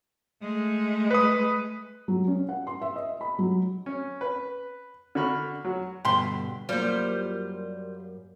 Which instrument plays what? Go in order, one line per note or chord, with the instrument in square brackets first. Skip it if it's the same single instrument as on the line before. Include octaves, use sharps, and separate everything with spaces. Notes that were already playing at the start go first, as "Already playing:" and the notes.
[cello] G#3 A3
[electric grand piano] B4 D#6
[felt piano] F#3
C#4
F#5
C6
E5
D#5
B5
F#3
[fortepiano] C#4
B4
D3 F#4 B5 C#6 F6
F#3 F#4
[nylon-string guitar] G2 B2 D3 [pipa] G4 C6
[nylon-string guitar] F#2 A#3 [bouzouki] G3 F4 C5